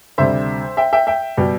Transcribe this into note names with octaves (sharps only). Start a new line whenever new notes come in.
D2 C3 G3 C5 E5
E5 G5
E5 G5
E5 G5
B2 G3